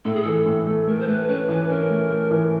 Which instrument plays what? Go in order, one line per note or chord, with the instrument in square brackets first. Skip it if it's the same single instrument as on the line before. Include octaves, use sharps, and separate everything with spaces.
[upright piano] A2 [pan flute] A4
[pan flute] G#4
[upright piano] E3 [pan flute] A4
[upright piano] A2
A3
[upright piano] A3 [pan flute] A#4
[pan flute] C5
[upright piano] A3 [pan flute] B4
[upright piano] C#4 [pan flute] B4
[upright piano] E3 [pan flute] B4
[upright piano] C#4 [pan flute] A#4
[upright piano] A3
A3
E3